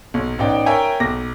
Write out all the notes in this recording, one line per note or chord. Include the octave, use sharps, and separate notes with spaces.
B1
A1 B3 D#4 D5 G5
A#4 C#5 E5 G5 G#5 A#5
B1 D6 A#6